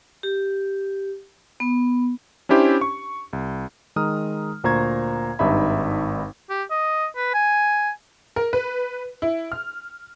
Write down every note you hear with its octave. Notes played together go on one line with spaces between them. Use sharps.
G4
B3
C#4 D4 E4 G4 C5
C#6
C2
D#3 G#3 A#5 D#6 F6
D2 A#2 C5 A#5 C#6 G#6
G#1 G2 D#4 E5 B5
G4
D#5
B4
G#5
A#4
B4
E4
F6